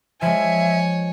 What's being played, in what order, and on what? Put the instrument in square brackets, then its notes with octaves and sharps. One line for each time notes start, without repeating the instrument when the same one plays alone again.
[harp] F3 G#3 [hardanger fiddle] C#5 G#5 [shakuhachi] E5